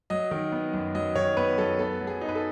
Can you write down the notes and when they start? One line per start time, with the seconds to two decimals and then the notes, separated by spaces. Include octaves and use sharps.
0.10 F#3 D#5
0.31 D#3
0.52 B3
0.73 F#2
0.95 F#3 D#5
1.15 D#3 C#5
1.37 B3 B4
1.58 F#2 A4
1.79 B3 A4
2.01 F#3
2.07 G#4
2.21 D#4
2.29 B4
2.35 A4